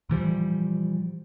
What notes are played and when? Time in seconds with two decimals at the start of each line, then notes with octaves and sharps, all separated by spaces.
0.09 A#2 E3 F3 G3